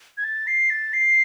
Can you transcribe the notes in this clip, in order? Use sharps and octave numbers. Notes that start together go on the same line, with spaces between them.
G#6
A6
C7
A6
C7